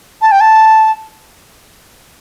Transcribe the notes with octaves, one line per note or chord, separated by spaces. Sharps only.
A5
G5
A5